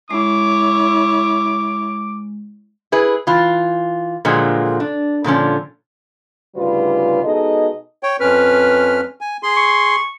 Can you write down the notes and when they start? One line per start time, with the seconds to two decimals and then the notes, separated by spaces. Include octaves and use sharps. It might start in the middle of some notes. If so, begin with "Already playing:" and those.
0.11 G#3 E4 C#5 D6
2.92 E4 G#4 B4
3.27 E3 F4
4.25 A#2 D3 F3 F#3 G#3
4.80 D4
5.24 A#2 D3 F3 C#4
6.56 D2 G#2 C#3 G3 F4 B4
7.24 B2 G#3 D#4 A4 D#5
8.03 C#5 G5
8.20 F2 C#4 B4 F6
9.21 G#5
9.43 G#4 C6
9.56 C#6